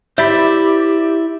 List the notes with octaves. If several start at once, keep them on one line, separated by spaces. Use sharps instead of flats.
E4 G4 C5 D5 E5 B5